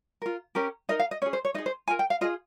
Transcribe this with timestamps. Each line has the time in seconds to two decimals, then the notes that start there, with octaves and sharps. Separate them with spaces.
0.22 F4 A#4
0.55 C#4 G4 A#4
0.89 D#4 A#4 D#5
0.99 F5
1.11 D#5
1.22 C#4 G#4 C#5
1.33 C5
1.45 C#5
1.54 D#4 D#5
1.58 G#4
1.66 C5
1.88 F4 A#4 G#5
1.99 G5
2.10 F5
2.21 F4 G#4 D#5